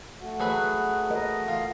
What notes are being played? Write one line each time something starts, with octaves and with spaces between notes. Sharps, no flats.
A3 F#4
F#3 G#4 B4
A#4 D#5
F4